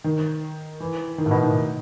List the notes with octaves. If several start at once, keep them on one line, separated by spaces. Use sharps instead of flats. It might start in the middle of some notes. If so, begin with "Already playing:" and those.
D#3
E3
D#3
A2
B2
D#3